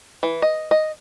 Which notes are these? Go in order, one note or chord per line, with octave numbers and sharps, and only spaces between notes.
E3
D#5
D#5